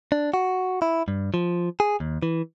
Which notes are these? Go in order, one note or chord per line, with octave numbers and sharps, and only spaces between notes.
D4
F#4
E4
G2
F3
G#4
D#2
E3